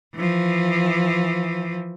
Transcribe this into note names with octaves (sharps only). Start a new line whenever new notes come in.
E3 F3